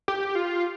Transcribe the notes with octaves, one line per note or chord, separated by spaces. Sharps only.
G4
F4